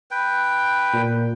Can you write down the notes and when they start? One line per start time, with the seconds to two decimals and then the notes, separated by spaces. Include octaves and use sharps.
0.11 B4 G5
0.94 A#2